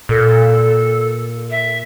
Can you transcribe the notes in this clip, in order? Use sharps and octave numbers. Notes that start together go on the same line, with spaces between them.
A#2 A4
E5